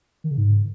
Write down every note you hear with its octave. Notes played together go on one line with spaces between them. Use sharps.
D#3
C#3
G#2